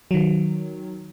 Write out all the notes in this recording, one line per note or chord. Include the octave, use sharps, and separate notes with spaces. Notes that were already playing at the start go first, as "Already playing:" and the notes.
D#3 F#3